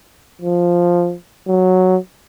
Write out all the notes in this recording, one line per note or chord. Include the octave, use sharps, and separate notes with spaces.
F3
F#3